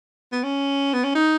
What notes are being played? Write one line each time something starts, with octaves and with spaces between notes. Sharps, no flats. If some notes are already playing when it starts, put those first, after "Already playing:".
B3
C#4
B3
C#4
D#4